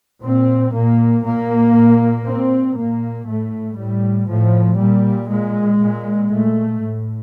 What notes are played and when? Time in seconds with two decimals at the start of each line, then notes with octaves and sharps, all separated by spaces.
0.23 A#2 C4
0.74 A#2 A#3
1.24 A#2 A#3
1.75 A#2
2.26 A#2 C4
2.77 A#2 A#3
3.26 A2 A3
3.77 A2 G3
4.27 A2 F3
4.78 A#2 G3
5.29 A#2 G#3
5.80 A#2
6.30 A#2 A3
6.81 A2